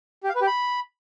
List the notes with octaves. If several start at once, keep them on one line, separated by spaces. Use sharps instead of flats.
G4
F5
B4
G4
B5